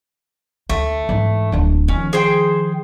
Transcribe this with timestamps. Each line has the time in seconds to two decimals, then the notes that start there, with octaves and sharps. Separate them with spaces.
0.69 D2 A3
1.09 G#2 E3
1.52 D1 D4
1.88 D#3 F3 C#4
2.13 G#4 C5 G5